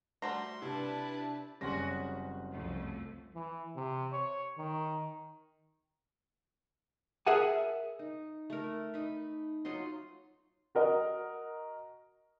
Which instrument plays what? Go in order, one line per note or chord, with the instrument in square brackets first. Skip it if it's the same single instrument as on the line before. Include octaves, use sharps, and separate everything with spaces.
[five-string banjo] G3 A3 A#5 [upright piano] F#4 C5 [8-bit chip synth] C6
[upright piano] C3 [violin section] D4 B4 A5 [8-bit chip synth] E4
[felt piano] F#1 C6 A#6 [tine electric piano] G3 C4 [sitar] C#4 F#4 G#4
[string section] C2 F2 A3
[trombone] E3
C3
C#5
D#3
[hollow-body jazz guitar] G#4 A#4 E5 F#5 G#5 A5
[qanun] D#4
A3 A#4
D#4 B5
F#3 D#4 F4 C6
[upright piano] F#4 A#4 D#5